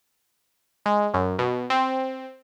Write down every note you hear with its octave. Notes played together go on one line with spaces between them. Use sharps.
G#3
F#2
B2
C4